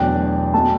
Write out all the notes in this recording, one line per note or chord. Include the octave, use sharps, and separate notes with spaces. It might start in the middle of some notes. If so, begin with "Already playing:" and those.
Already playing: E2 B2 F#3 A3 D4 G5
B2 A3 A5